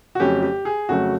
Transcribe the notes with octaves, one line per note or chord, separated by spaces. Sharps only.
F#4
F2 C#3 F#3 A3 C#4 G4
G4
G#4
F2 C#3 F#3 A3 C#4 F#4